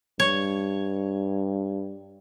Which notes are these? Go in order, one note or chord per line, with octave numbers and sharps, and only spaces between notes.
G2 C#5